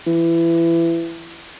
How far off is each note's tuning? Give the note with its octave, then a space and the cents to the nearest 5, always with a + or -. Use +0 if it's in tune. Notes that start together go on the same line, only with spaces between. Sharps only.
E3 +25